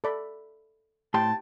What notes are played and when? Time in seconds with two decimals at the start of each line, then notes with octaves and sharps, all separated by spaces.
0.04 A4 D5 B5
1.14 A2 G4 G5 A5 C6